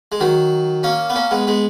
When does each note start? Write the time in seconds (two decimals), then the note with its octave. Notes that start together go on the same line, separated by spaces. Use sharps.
0.12 G#3
0.20 D#3 F#3
0.83 A#3 C#4
1.10 B3
1.15 A#3 C#4
1.31 G#3 B3
1.47 G#3 B3